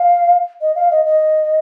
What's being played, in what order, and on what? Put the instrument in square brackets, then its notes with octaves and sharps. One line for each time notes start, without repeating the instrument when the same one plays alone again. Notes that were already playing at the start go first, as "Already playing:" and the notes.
Already playing: [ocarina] F5
D#5
F5
D#5
D#5